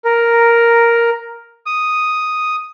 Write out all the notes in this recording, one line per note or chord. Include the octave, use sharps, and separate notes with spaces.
A#4
D#6